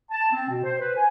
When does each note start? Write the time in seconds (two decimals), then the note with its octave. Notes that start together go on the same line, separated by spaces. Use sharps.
0.11 A5
0.33 C4
0.49 B2
0.64 C5
0.81 B4
0.96 G#5